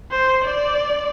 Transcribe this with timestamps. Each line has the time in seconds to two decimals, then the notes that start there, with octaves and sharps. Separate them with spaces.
0.11 C5
0.44 D5